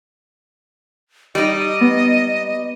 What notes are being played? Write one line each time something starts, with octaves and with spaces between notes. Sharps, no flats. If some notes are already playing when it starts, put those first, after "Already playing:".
G3 D#4 D#5
B3